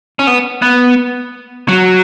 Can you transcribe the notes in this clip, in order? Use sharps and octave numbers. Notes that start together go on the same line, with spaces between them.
C#4
B3
B3
F#3